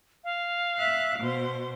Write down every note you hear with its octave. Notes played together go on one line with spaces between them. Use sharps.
F5
E5 F#6
B2 C5